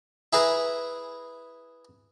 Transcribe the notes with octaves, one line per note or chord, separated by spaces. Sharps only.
E4 G#4 B4 A#5